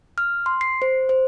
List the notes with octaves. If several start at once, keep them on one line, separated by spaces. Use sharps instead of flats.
F6
C6
C7
C5
C5